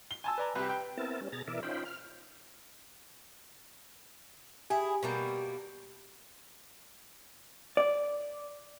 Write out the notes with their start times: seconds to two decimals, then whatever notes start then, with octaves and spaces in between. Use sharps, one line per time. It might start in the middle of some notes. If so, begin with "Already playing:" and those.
0.11 G7
0.24 G#5 A5 E6
0.38 B4 D5 A#5
0.55 C2 G4 B4
0.69 G5
0.97 B3 C4 E4 A#4 A5
1.21 G3 C#4
1.32 B2 G#4 A#5 A6
1.48 B2 E3 A#4 D5 E5
1.63 C#4 D#4 F4 C5 G5 B5
1.85 F6
4.70 E4 G4 G#4
5.03 B2 G3 A#3
7.77 D5